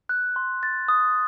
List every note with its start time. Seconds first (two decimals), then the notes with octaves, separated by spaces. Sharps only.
0.09 F#6
0.36 C6
0.63 A6
0.88 D#6